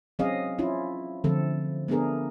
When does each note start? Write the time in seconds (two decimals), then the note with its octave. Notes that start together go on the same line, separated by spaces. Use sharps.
0.19 F#3 C4 C#4 G#4 D#5 F5
0.59 C#4 E4 F4
1.24 D3 F3 A3 C4 A4
1.88 A3 B3 D4 G#4 A#4